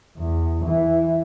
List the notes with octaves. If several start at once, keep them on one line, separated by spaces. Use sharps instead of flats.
E2
E3